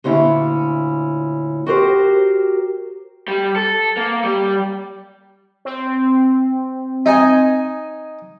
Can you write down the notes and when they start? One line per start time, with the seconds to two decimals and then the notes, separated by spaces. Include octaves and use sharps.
0.04 D2 A#2 C#4 E4
1.66 F#4 G4 A#4 C5
3.28 G3
3.56 A4
3.97 A#3
4.24 G3
5.65 C4
7.06 D#4 G#5